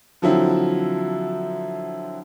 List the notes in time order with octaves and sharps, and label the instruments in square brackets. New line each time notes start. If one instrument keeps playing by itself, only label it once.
[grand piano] D3 F3 F#3 C4 E4